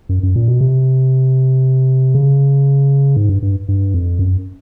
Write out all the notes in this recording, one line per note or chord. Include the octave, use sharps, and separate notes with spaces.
F#2
F#2
A#2
B2
C3
C#3
G#2
G2
G2
G2
F2
F#2